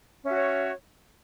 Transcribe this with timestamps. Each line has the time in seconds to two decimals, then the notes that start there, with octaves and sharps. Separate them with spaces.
0.22 C#4
0.27 E5
0.31 F#4
0.36 C#5